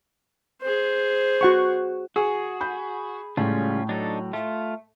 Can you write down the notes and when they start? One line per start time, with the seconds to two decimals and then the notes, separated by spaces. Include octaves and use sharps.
0.62 G#4 C5
1.41 F#4 F#5 C#6
2.16 F#4 G#4
2.60 B5 G6
3.37 A2 C#3 G3 G#3 C#4 F4
3.89 F#3 D4 D#4 A4
4.33 A3 F4